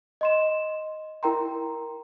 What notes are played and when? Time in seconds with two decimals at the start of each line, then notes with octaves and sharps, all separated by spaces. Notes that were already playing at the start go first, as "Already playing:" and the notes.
0.21 D#5 C6 E7
1.23 E4 A#4 G5 A#5 C6